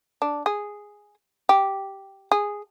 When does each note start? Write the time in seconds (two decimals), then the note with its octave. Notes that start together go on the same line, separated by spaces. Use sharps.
0.22 D4
0.46 G#4
1.49 G4
2.32 G#4